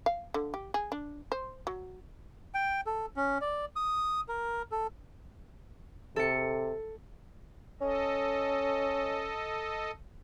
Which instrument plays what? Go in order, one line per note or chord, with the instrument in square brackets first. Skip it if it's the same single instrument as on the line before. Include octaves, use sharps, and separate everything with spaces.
[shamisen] F5
D3
G4
G#4
D4
C5
F#3
[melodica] G5
A4
C#4
D5
D#6
A#4
A4
[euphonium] C3 [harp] A4 C#7
[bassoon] C#4 [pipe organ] A4 D#5